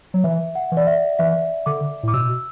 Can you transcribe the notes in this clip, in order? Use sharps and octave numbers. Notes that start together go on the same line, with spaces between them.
F#3
E3 E5
F#5
E3
D5
E5
E3 E5
D3 D6
A2 D6
B2 E6